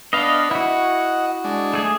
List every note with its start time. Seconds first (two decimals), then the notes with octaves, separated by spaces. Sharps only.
0.13 B3 D4 B4 D#5 F5
0.51 E4 F#4 D#5 F#5
1.44 G#3 D4
1.73 A3 G#4